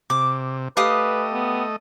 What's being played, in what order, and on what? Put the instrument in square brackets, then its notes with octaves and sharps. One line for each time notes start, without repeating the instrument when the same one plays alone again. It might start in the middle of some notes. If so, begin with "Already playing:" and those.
[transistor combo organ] C3 [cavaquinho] D6
[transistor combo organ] A3 D#5 [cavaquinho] G4 F5 D#6 [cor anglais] B4
[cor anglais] B3